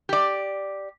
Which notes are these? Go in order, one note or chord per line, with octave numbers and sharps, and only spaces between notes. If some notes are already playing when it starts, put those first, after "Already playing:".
G4 D5